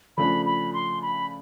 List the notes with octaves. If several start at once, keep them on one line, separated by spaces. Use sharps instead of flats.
C#3 F3 A3 D4 B5
B5
C6
B5